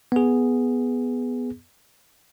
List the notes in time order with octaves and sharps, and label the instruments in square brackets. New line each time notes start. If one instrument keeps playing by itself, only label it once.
[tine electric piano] B3 G#4